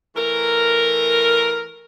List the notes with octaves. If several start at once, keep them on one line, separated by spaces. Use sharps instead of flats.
E3 A3 A#4